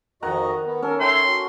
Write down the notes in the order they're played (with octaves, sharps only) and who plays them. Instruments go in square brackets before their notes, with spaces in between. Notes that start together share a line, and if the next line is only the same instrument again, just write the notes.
[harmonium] F2 F#4 D#5 [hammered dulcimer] D#3 F#5 A#5
[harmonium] B3
[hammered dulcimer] C#4 A4 [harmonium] A#4
[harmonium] A4 C#5 E5 [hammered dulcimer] G5 [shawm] C6
[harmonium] F#4